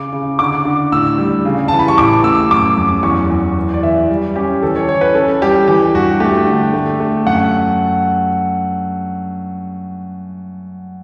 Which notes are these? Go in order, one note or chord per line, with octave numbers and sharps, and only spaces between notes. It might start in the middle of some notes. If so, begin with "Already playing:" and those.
Already playing: C#3 D6
C#3
D3 D6
D3
A2 E6
G3
C#3
E3 A5
B5
C#6
A1 D6
A3 E6
F#2 D6
F#2
E2 C#6
E2
E3
D5
E3 E5
G3
C#4 G4
E3 A4
C#5
E3 C#5
B4
C#4 A4
G3 G4
E3 G4
G2 F#4
A3 G4
D3
A3
A3
F#2 F#5